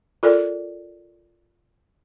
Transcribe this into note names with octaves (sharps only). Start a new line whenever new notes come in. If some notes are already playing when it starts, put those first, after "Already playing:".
F4 A4 A#4 D5